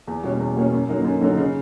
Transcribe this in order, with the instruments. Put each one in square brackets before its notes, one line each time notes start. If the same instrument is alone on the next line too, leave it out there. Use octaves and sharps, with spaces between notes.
[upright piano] E2
B2 G3 A#3 C#4
E2
B2 G3 A#3 C#4
F#2
D3 F#3 A#3 D#4
F#2
D3 F#3 A#3 D#4
C#3